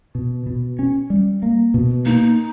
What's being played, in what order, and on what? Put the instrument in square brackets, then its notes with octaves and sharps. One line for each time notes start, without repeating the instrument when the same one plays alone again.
[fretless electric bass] B2
B2
C#4
G3
A#3
B2
[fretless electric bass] A#3 [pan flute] D#4